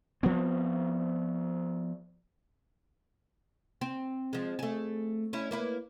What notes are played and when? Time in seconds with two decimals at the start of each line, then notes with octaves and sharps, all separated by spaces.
0.23 F3 B3 C4
3.81 C4
4.33 F3 G#3
4.59 A3 G#4
5.33 C#4 E4
5.51 A#3 E4 B4